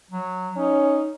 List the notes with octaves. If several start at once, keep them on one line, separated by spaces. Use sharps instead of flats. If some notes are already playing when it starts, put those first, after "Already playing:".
F#3
C#4 D#4